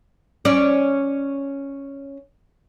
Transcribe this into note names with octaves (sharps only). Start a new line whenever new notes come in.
C#4 D5